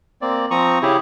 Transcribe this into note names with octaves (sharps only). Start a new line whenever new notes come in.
A#3 C4 D5
F3 C4 A#5 C#6 D#6
C#3 E4 G4 G#4